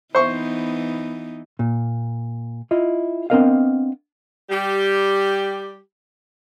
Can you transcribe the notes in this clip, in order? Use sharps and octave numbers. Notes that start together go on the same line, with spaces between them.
E3 B3 D#4 C5 C#6
A#2
E4 F4 D#5
B3 C4 D4 A#4 D#5 F5
G3 G4